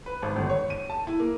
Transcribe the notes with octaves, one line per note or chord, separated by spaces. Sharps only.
B4
G#1
G1
C#5
D#7
A5
E4
A#3